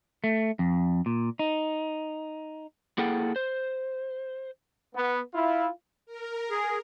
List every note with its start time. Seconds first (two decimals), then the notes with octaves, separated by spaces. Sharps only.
0.24 A3
0.59 F2
1.06 A#2
1.39 D#4
2.98 A#3 E4 G#4 A4 F#5 G5
3.36 C5
4.95 B3
5.34 E4 F4
6.06 A#4
6.50 G#4